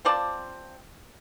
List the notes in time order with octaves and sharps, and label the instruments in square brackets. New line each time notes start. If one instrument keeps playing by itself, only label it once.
[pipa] C4 F4 D5 A5